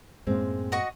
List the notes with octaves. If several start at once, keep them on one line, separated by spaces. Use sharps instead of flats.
F#2 A2 G#3 A#3 C4
F#4 D#5 C#6